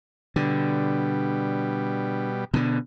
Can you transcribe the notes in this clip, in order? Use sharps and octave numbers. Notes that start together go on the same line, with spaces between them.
B2 D3 G3
B2 D3